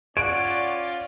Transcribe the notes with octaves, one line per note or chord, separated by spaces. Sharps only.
C#4 F4 C#5 D5 F#5 D7